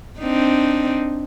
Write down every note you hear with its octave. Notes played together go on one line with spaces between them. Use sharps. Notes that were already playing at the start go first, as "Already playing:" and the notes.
C4 D4 D#4